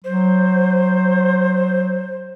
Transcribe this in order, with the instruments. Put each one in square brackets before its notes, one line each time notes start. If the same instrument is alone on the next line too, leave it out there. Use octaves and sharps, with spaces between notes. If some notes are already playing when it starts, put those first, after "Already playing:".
[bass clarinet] F#3 [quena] C5